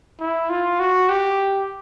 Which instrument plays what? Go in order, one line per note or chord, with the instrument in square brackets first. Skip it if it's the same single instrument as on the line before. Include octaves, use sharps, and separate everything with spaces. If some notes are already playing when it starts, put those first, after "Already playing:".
[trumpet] E4
F4
F#4
G4